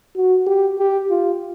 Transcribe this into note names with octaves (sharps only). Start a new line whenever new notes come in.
F#4
G4
G4
F4